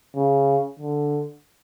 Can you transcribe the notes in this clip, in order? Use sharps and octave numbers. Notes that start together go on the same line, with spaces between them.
C#3
D3